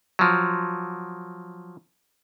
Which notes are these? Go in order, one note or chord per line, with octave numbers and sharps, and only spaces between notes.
F3 F#3